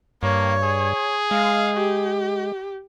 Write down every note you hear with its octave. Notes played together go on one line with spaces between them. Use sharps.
G2 A#3 C#5
G#4
G#3 F5
G4